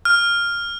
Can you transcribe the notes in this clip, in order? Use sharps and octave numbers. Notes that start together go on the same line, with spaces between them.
F6